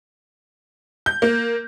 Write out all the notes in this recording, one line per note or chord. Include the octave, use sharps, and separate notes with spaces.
G6
A#3